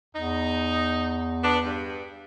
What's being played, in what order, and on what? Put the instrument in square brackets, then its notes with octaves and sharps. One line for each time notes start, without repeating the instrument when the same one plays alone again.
[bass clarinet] E2 [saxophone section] D#4
[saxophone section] B3 D4
G2